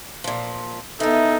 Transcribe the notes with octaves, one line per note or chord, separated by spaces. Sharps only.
A#2 F3
E3 B3 D#4 A4 A#4